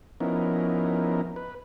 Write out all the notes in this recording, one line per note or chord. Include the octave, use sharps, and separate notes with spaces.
F3 B3 C#4 D#4 E4 A#4
B4